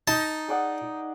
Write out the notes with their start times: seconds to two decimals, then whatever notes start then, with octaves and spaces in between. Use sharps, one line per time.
0.08 D#4 A5
0.48 G#4 D5 F#5